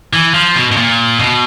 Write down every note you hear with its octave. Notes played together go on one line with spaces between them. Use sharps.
E3
F3
B2
B2
A#2
B2